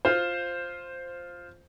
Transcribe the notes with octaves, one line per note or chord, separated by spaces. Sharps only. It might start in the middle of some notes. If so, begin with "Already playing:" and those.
F4 C5